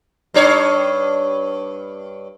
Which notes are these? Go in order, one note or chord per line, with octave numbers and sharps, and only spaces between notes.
G2 D4 C#5